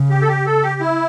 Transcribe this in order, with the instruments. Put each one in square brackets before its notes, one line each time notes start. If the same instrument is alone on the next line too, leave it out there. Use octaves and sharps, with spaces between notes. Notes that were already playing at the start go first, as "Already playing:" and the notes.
Already playing: [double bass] C#3
[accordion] G4
A4
G4
A4
G4
E4